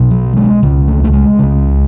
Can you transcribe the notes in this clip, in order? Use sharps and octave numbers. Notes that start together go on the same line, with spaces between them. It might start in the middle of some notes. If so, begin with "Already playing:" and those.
Already playing: B1 B2
F#3
G#3
C#2 C#3
A3
A3
G#3
C#2 C#3